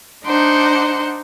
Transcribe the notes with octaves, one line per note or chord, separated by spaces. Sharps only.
D4 D#4 C5 F#5